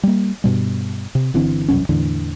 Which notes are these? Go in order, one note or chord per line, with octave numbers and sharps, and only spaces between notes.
G3 A#3
G2 B2 G3
C3
G1 D3 E3 C4
E1 C2 F#2 C#4
E2 A2 D3 E3